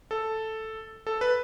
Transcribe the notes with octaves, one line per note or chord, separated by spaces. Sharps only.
A4
A4
B4